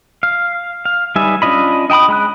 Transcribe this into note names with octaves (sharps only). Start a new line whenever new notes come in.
F5
F5
G3 D#4 B4 E5 G#5
C#4 D4 F4 D#5 B5
D#5 G5 A5 B5 D#6
G#3 B5 F#6